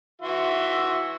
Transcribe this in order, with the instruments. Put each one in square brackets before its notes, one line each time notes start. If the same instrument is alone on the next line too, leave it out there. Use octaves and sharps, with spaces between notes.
[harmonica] E3 F#4 C6 [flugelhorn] E5